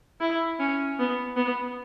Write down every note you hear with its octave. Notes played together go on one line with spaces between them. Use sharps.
E4
C#4
B3
B3